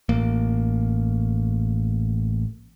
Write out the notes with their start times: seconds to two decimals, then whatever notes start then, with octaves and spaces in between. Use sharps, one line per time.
0.09 A1 A#3